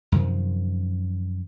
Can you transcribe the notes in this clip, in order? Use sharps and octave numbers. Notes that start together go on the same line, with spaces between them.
F#2 C3 D#3 F3